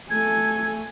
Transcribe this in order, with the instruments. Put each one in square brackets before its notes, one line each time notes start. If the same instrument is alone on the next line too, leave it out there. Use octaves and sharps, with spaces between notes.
[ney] A3 [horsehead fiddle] A4 G#5 [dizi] G#6